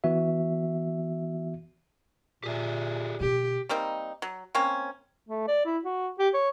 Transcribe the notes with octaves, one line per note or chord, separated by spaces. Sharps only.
E3 B3 F#4 E5
A#2 G4 G#4 E5
B2 D3 G4
G3 A#3 C4 D#4
F#3
A#3 C4 C#4 C#5
A3
D5
E4
F#4
G4
C#5